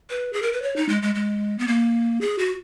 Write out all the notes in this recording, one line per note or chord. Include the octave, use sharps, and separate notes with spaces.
B4
G#4
A#4
B4
C#5
D#4
G#3
G#3
G#3
B3
A#3
G#4
F#4